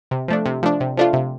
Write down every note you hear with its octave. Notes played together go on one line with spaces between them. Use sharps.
C3
F3 A3 D4
C3
F3 A3 D4
C3
F3 A3 D4 F4
C3